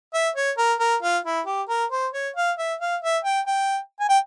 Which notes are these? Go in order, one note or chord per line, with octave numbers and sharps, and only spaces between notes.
E5
C#5
A#4
A#4
F4
E4
G4
A#4
C5
C#5
F5
E5
F5
E5
G5
G5
G#5
G5